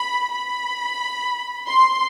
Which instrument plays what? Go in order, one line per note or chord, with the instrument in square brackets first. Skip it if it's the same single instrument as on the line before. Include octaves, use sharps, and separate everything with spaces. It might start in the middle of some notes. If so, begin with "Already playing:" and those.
Already playing: [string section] B5
B5
C6